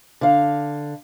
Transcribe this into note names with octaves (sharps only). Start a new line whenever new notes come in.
D3 F5